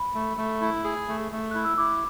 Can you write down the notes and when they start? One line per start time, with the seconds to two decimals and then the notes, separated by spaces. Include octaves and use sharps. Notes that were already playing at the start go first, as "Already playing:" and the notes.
Already playing: B5
0.14 A3
0.37 A3
0.61 E4
0.84 G#4
1.08 A3
1.32 A3
1.51 E4 F#6
1.65 E6
1.78 E4 D6